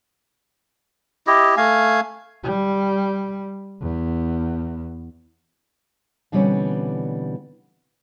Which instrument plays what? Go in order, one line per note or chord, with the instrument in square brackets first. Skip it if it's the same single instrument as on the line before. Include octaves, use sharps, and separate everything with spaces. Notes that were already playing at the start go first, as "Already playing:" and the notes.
[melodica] E4 G4 D#5
A3 F5 G#5
[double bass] G3
E2
[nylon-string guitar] B2 D3 E3 G3 C4 C#4